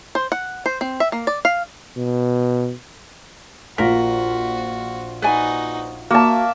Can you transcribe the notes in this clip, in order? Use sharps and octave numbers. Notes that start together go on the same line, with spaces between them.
C5
F#5
C5
C4
E5
A#3
D5
F5
B2
A#1 F4 F#4 A#4 B6
D#4 F#4 B4 D5 G#5
A#3 F#4 E5 A5